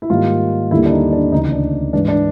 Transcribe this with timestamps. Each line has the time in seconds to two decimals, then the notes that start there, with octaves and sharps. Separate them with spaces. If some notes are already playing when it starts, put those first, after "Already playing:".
0.02 E4
0.10 G#2 D#3 G3 A#3 F4
0.71 D#2 D3 G3 A#3 E4
0.86 D4
0.91 D#4
1.12 D4
1.32 D2 C#3 E3 D#4
1.52 D4
1.93 G#2 E3 G#3 D4
2.08 D4